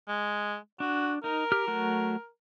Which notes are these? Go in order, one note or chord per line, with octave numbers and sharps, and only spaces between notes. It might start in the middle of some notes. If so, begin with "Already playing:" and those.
G#3
D4 F#4
D#4 A#4
G4 F6
F#3 A3 F#4